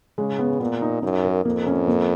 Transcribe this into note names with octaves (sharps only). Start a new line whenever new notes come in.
C#3 G#3
B3
A#2 B3
D#4
F#2 D#4
A#4
F2 A#3
C#4
A#3